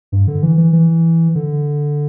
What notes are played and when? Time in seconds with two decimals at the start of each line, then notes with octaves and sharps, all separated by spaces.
0.12 G2
0.27 D3
0.42 E3
0.58 E3
0.73 E3
1.35 D3